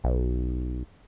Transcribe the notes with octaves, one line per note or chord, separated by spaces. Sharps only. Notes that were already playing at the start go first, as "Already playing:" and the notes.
B1